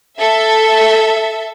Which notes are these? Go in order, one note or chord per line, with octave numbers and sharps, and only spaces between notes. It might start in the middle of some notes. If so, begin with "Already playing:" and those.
A4 E5